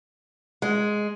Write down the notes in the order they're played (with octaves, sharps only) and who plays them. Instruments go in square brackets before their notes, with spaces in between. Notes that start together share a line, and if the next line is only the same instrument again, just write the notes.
[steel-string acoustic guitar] G#3